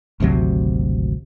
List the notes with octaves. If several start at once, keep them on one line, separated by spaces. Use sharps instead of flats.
G#1 D2 C3 F#3